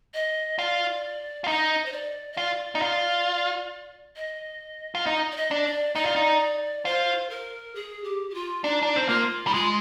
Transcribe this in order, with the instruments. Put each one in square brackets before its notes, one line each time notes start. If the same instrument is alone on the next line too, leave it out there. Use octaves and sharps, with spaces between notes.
[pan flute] D#5
[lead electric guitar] F4 [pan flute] D5
[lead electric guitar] F4
[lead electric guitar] D#4 [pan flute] D#5
[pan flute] C5
D5
D#5
[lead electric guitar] F4 [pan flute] D5
[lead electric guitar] D#4
F4
[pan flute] D#5
[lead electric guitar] F4
D#4
[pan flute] D5
D#5
[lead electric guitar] D4
[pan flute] D5
[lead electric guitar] D#4 [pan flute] D5
[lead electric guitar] F4
D#4
[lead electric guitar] F4 [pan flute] C5
[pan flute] A#4
G#4
G4
G4
F4
[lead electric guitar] D4 [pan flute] D#4
[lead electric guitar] D4
C4
[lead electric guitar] A#3 [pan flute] F4
[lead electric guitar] G3 [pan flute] D#4
[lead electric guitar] G#3 [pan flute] F4